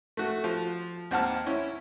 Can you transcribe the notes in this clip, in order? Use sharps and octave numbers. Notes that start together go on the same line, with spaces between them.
A3 F#4
F3
D#2 C4 F#5 A5 F6
C#4 E4